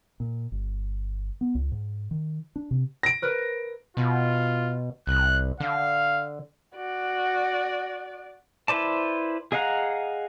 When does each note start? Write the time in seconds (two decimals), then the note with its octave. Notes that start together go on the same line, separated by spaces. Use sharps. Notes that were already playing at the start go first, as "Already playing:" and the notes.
0.20 A#2
0.52 G1
1.41 B3
1.55 C#2
1.72 G#2
2.11 D#3
2.56 D4
2.71 C3
3.03 A#6 D7
3.22 A#4 B4
3.97 B2 F4
5.07 C2 F#6
5.60 D3 F5
6.75 F#4 D5
8.68 E4 B4 C5 D5 A5
9.52 G#4 D#5 F5 F#5 A#5